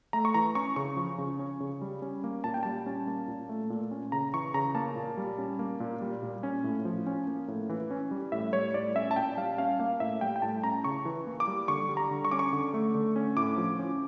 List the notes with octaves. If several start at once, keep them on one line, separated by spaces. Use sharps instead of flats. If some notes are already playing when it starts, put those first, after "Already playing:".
A3 A#5
C#6
E3 A#5
C#4 C#6
C#3 C#6
F3
C#3
C#4
C#3
G3
C#4
A#3
A#2 A5
G5
G3 A5
C#4
A#3
A#2
A3
A#2
C#4
C#3 A#5
E3 C#6
C#3 A#5
A#3 A5
A#2
G3
C#4
A#3
A#2
G3
A#2
C#4
A2
F3
C#4
A#3
A2
E3
C#4
G3
A2 E5
G3 C#5
A2 D5
C#4 E5
A5
A#2 G5
G3 F5
C#4 F5
A#3 F5
A2 E5
G3 G5
G5
A2 A5
C#4 A#5
C#3 C#6
E3
A#3
D6
G3
D3 C#6
G3
A#5
D3
C#6
C#4 D6
C#6
D3
A3
D3
C#4
A2 D6
F3
C#4